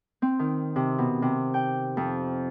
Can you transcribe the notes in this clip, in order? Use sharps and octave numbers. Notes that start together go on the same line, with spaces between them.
C4
D#3
C3
B2
C3
G5
F2